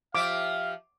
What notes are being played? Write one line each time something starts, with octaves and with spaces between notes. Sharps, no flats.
F3 G4 E5 F5 D6